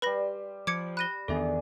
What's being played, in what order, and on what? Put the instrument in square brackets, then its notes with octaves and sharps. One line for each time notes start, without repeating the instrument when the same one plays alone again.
[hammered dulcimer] G3 C6 [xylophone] B4 B5 A#6
[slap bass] F3 [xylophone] D6 G#6 C#7 [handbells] D7
[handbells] B5 A#6 [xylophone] F#6 D#7 G7
[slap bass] E2 D#3 B3 [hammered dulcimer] D4 G#4 [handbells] A4 E5